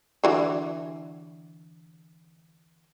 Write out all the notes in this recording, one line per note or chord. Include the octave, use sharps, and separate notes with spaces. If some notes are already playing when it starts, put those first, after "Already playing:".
D3 E3 F#3